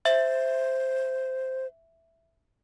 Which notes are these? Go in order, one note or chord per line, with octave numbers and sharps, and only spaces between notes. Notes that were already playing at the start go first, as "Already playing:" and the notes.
C5 E5